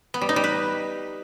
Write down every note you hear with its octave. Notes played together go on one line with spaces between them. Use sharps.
B3
G3
D#4
G3
B4